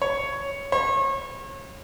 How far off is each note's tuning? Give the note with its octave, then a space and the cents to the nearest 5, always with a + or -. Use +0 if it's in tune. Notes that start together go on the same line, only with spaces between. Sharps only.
C#5 +5
C#5 -35